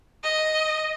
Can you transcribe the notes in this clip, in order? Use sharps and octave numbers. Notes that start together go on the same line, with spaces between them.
D#5